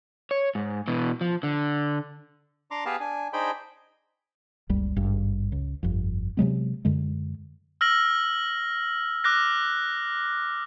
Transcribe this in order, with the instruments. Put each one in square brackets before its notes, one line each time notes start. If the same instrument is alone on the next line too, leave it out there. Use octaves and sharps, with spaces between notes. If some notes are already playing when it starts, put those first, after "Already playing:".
[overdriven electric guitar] C#5
G#2
B2 E3
F3
D3
[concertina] D4 A#5 C6 D6
B3 G4 G#4 B4 F5 A5
D4 G#5
D4 D#4 G#4 C5 G5 B5
[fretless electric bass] F#1 C#2 G3
G#1 G2
C#2
G1 F2
C3 F#3 G#3 B3
F#2 D3 G#3
[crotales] E6 F6 A#6 F#7
D6 F6 F#6 A#6